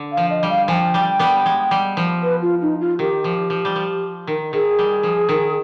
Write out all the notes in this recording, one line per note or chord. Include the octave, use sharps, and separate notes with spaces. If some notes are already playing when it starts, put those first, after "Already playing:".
Already playing: D3
F5
F3
D#5
G3
F5
F3 G5 G#5
G3
G3 B3
G#3
G3
F3
B4
F4
D#4
F4
D#3 G4
F3
F3
G3
F3
D#3
D#3 G#4
G3
F3
D#3